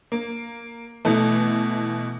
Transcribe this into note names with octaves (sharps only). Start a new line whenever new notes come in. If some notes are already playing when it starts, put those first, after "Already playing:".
A#3
B2 E3 A3